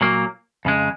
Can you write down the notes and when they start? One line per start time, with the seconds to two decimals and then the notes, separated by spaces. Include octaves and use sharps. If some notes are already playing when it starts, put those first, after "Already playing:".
0.01 A#2 F#3 A#3
0.65 F2 C#3 G#3